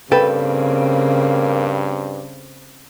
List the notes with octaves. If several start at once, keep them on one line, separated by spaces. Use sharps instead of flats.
G2 C#3 A#3 C4 A4 B4 G5